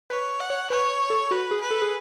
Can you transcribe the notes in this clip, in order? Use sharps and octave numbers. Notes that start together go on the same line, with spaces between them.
B4 C#5
F#5
C#5
B4 C#5
A4
F#4 B4
G#4
B4
A4
G#4